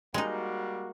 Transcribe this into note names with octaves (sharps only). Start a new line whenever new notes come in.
G3 G#3 A#3 D#4 F#4